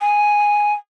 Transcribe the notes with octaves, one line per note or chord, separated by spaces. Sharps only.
G#5